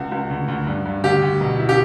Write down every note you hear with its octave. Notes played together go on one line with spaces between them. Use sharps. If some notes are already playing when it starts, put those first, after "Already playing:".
Already playing: C#2 F#4
C#2
D2
D2
G2
G2
D2 G4
D2
B2
E4
G4